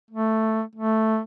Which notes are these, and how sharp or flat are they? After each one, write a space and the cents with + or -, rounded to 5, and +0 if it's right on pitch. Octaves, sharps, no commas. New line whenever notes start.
A3 +5
A3 +0